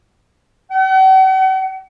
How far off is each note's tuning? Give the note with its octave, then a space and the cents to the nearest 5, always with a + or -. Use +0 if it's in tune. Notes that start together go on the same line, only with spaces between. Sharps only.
F#5 +45